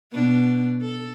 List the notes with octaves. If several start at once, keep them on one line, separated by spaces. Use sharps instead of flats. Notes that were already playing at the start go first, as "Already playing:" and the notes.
B2 B3 D4
A4